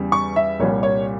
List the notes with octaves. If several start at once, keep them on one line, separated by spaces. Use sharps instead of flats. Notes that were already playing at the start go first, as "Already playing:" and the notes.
Already playing: E2 C#3 G3
C#6
E5
C2 A#2 G3 C#5
C#5